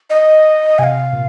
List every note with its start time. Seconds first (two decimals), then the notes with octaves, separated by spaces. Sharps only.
0.10 D#5
0.79 C3 F5 G#5
1.13 A#2